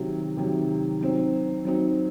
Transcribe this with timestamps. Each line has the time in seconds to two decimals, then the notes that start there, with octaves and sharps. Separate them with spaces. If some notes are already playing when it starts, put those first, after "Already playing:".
Already playing: C3 D#3 F#3
0.37 C3 D#3 F#3
1.01 F#3 C4 D#4
1.65 F#3 C4 D#4